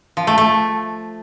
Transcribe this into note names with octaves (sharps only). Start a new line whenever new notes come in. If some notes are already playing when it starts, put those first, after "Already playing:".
F3
A3
A3